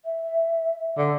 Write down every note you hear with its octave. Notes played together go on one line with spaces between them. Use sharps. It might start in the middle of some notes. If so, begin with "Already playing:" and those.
E5
D3